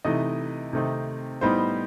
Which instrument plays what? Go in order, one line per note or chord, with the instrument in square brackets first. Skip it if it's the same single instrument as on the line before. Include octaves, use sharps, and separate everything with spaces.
[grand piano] C3 E3 A3 D#4 D#5
C3 D#3 A3 C4 D#4
A2 G3 B3 D#4 C5